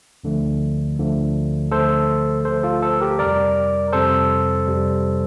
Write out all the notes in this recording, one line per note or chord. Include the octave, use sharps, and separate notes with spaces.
D2 D3 F3 A3
D2 D3 F3 A3
D2 D3 F3 A3 A4 C5
D2 D3 F3 A3 A4 C5
F4 A4
A4 C5
G4 A#4
F2 C3 G3 A#4 D5
F2 C3 G3 A4 C5
F2 C3 G3